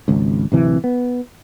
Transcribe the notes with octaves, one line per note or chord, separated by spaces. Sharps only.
G#1 C#2
D1 C3 E3
B3